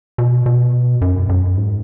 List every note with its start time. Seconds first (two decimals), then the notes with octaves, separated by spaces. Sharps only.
0.18 B2
0.46 B2
1.01 F#2
1.29 F#2
1.57 G#2